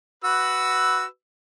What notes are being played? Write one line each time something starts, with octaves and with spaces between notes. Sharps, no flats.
F#4 B4 E6